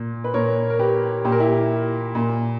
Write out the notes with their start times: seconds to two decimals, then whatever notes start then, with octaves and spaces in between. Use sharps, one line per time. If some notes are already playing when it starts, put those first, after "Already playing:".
Already playing: A#2
0.24 B4
0.34 A#2 A#4 C#5
0.70 A#4
0.79 G4 B4
1.25 A#2 G4
1.32 A#4
1.40 E4 G4
2.15 A#2